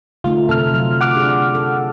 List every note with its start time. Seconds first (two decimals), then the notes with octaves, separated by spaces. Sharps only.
0.24 D3 A3 D#4 F4
0.49 C3 C4 A4 F6
0.73 F#3 F4
1.01 F#5 D6 F6
1.15 D4 G4 G#4
1.55 A4